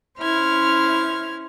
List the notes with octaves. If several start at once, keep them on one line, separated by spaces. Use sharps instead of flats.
C#4 E4 C5 F6 G#6